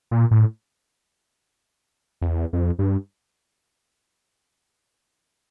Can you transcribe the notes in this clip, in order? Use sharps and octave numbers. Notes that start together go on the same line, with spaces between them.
A#2
A2
F2
E2
F2
G2